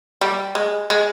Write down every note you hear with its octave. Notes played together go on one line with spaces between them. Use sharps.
G3
G#3
G#3